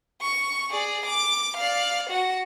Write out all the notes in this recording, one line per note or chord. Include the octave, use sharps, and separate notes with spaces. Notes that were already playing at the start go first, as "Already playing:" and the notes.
C#6
G#4 D5
D6
D5 F5
F#4 F#5